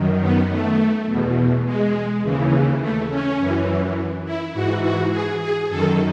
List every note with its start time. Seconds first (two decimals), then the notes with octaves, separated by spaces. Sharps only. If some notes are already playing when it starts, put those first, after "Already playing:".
Already playing: F#2 D#3
0.21 B3
0.50 A3
1.07 E2 B2
1.65 G#3
2.23 D#2 C#3 E3
2.81 A3
3.10 C#4
3.39 F#2 E3
4.25 E4
4.53 G#2 F#4
4.58 E3
4.82 F#4
5.11 G#4
5.40 G#4
5.69 F#2 D#3 A4